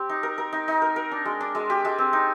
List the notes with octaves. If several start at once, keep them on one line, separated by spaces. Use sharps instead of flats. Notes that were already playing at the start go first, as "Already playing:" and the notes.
Already playing: C4 G4
D#4
A#4
A#4
D#4
D#4
A#4
A#4
D4
G#3
D4
G#3
G4
G#3
C4
D#4